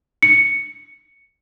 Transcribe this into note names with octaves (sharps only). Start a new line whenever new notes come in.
C#7